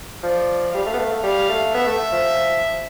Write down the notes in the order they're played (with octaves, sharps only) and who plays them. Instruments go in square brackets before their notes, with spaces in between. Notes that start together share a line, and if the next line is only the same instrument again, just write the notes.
[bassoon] F3 [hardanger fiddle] D5
[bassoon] G3 [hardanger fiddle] F5
[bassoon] A3
B3
A3
A3
[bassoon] G3 [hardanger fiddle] F5
[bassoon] A3
[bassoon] B3 [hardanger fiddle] E5
[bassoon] A3
F3